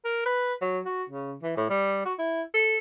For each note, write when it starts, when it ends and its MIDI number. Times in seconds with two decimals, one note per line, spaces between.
0.04 0.24 70
0.26 0.54 71
0.61 0.80 54
0.85 1.03 66
1.10 1.35 49
1.43 1.53 52
1.57 1.65 45
1.70 2.05 55
2.05 2.14 66
2.18 2.42 64
2.54 2.77 69